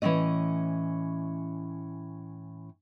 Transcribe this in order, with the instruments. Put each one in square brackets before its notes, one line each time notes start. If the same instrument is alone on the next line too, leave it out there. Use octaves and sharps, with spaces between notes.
[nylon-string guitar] A2 E3 F#3 C4 C#4 D#5